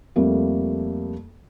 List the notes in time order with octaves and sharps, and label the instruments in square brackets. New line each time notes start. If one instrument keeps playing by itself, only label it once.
[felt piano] F2 G3 A3 A#3